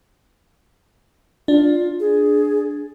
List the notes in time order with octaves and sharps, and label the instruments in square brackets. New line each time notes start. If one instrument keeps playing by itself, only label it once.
[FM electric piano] D4 [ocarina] F4
[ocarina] G#4